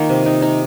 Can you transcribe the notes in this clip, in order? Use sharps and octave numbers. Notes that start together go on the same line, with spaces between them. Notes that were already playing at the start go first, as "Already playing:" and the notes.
Already playing: D#3 A#3 F4
C3
D#4
D#4